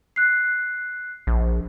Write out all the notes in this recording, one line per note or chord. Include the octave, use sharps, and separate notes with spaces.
F#6 C7
A#1